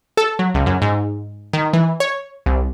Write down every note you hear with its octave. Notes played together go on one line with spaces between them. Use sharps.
A4
F#3
C#2
F#2
G#2
D#3
E3
C#5
C2